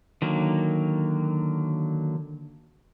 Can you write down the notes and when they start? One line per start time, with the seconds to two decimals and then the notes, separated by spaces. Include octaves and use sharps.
0.22 D3 D#3 F#3 A#3